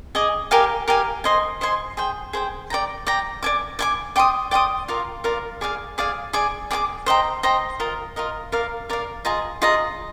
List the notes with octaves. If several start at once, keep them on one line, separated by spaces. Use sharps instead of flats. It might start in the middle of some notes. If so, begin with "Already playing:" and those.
G#4 D#5 G#5 D6
G4 A#4 F5 G#5
G4 A#4 F5 G#5
C5 D#5 G#5 C6
C5 D#5 G#5 C6
G#4 C5 G5
G#4 C5 G5
D5 G5 A#5
D5 G5 A#5
D5 G#5 D6
D5 G#5 D6
D5 G5 C6 D#6
D5 G5 C6 D#6
F4 A#4 D5 F5
F4 A#4 D5 F5
G#4 D5 F5 G#5
G#4 D5 F5 G#5
G#4 D5 G#5 D6
G#4 D5 G#5 D6
C5 D#5 G5 A#5
C5 D#5 G5 A#5
F4 A#4 D#5
F4 A#4 D#5
A#4 D5 F5
A#4 D5 F5
F4 G#4 D#5 A#5
F4 G#4 D#5 A#5